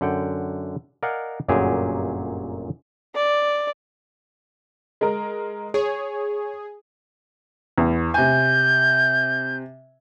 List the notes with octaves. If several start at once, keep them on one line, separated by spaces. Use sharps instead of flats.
F#2 D3 F#5 G5
A#4 D5 D#5 F5 F#5 G#5
G1 F#2 A#2 F#3 G4 G#4
D5
G#3 A#4
G#4 C#5
E2
C3 G#5 G6